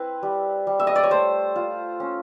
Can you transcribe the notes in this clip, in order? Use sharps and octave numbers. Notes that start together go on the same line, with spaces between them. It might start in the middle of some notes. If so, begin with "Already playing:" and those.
Already playing: C4 E4 B4
G3
G3
E5
D#5
D5
C#5
A3 C5
F4
C#4